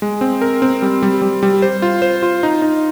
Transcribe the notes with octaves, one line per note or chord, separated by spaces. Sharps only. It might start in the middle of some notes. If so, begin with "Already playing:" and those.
G#3
C4
A#4
C4
G3
G3
G3
G3
C5
F4
C5
F4
D#4
D#4